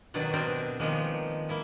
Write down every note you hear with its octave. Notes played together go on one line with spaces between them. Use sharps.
B2 D#3 F#3 D4
B2 C4 D4 G4 A#4 C5
D#3 F3 G#3 A#3
A#3 E4 E5